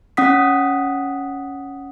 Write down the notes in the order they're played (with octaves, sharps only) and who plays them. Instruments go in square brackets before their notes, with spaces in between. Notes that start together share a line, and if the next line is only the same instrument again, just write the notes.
[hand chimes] C#4 F#5 D#6 B6